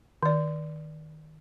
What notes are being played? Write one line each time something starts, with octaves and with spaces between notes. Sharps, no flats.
D#3 D5